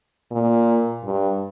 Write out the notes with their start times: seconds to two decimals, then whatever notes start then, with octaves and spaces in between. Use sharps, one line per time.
0.31 A#2
1.05 G2